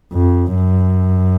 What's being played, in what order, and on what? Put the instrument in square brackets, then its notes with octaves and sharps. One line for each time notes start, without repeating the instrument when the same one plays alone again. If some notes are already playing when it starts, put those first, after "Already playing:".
[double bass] F2
F#2